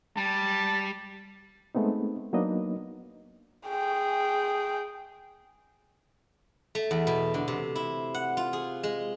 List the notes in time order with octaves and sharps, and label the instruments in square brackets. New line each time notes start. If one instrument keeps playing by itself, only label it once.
[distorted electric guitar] G3 [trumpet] A5
[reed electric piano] G#3 A3 B3 C4 D#4
F#3 A#3 B3 D4 D#4 D#5
[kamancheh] G#4 G5
[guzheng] A3
E2
B2
D3
C3
E4
F#5
F4
G#4
G#3